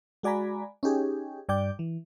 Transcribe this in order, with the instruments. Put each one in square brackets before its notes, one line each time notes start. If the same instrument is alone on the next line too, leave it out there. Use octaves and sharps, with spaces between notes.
[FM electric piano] G#3 F#4 D5 G#5 A#5 B5
C#4 D#4 G4 G#4
G2 D5 G5 D6 G6
E3